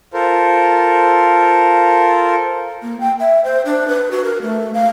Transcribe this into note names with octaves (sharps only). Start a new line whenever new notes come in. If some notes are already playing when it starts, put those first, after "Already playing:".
F4 A4 A#4 C5
A#3
G5
E5
C5
D4
B4
F#4
A#4
A3
F5